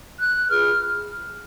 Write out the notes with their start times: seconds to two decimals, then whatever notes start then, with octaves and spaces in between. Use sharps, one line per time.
0.19 F#6
0.49 F4 G#4 B4 F6